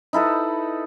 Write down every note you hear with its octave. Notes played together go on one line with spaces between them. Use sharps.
D#4 E4 A4 B4